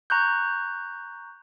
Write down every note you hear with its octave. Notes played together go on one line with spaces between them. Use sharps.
A#5 C#6 F#6 G6